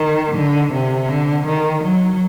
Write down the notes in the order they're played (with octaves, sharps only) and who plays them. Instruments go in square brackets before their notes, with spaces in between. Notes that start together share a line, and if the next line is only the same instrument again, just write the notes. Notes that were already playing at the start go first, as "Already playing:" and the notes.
Already playing: [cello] D#3
D3
C3
D3
D#3
F#3